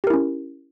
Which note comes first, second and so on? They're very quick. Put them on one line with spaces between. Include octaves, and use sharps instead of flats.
G4 A#4 E4 C#4